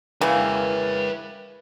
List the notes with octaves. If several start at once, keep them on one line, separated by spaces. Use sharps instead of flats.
C#3 E3 A#3 B4 G5